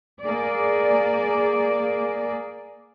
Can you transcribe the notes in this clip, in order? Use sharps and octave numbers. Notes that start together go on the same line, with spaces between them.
A#3 G#4 D5